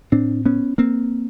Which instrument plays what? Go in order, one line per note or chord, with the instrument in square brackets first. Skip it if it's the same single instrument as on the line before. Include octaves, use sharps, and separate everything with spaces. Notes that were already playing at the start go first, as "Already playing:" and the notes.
[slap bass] A2 C4 D4
B3 C#4
A#3 C4